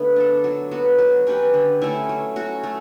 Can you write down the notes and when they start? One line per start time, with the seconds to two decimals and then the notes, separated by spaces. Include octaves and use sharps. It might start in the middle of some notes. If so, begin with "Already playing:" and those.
Already playing: D3 A3 B3
0.16 D4 A4
0.44 F#3
0.71 B3 F#4
0.98 F#3
1.27 C#4 G4 B4
1.54 D3
1.81 A3 C#4 E4
2.09 F#3
2.36 C#4 F#4
2.63 A3